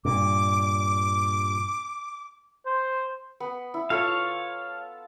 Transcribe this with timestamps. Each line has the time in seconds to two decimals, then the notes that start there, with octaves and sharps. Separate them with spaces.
0.05 G2 A#2 D6
2.66 C5
3.40 B3
3.74 E4
3.90 F4 A4 C#5 F5 A5